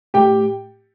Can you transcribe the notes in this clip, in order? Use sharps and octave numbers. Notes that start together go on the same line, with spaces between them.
A2 G4 G5